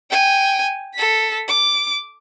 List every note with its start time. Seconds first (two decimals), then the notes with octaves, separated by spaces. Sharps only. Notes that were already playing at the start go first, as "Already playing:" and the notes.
0.10 G5 G#5
0.94 A4 B6
1.48 D6